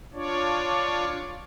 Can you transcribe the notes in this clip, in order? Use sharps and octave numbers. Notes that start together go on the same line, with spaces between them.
D4 F4 C#5 D5